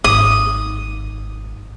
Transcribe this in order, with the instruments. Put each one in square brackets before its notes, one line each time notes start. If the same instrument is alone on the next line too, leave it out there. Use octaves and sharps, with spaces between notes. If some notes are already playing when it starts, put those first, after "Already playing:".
[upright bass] G#1 [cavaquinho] D#6